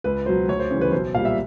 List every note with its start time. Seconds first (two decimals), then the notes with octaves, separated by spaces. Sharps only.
0.04 C#2 B4
0.26 B2 F#3 C5
0.48 D2 C#5
0.59 C5
0.71 C#3 E3 G3
0.81 B4
0.92 B1 C5
1.14 A#2 F5
1.18 G3
1.25 E5